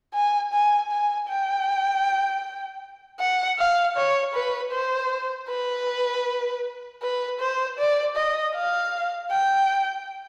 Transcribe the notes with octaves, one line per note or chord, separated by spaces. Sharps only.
G#5
G#5
G#5
G5
F#5
F5
C#5
B4
C5
B4
B4
C5
D5
D#5
F5
G5